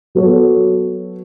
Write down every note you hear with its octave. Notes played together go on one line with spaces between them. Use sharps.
F#3 B3 F#4 A4 C#5